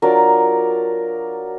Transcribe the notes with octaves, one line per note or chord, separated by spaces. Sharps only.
F#3 D4 F4 A#4 D5